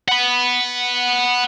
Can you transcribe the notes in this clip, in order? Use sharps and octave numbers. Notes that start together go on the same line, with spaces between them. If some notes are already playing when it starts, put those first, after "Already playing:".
F#5 B5